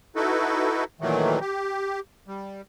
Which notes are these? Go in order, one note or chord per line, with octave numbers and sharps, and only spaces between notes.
D#4 E4 F#4 A4 B4
A#2 D#3 E3 F#3 A3
G4
G3